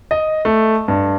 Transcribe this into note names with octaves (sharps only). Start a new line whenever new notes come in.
D#5
A3
G2